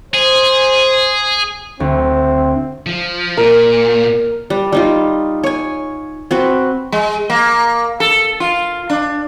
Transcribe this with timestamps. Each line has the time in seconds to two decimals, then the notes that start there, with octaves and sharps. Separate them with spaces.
0.14 G#4 C5
1.80 D2 C4
2.86 F3
3.37 A#2 A#4
4.50 G3
4.72 G3 D#4 F4
5.44 C#5 G#5
6.31 C4 F#4 B4
6.92 G#3
7.30 A#3
8.00 A4
8.40 F4
8.90 D4